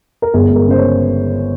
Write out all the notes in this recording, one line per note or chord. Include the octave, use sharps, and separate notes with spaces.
A#4
G1 G#4
G#3
A#4
C#3 C5
C#5